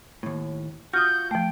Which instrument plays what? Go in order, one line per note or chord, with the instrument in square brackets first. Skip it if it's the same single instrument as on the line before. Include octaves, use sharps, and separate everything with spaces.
[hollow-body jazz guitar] D#2 A2
[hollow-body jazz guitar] F4 F#4 [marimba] D#6 F6 [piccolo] G6
[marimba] F3 A3 [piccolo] G5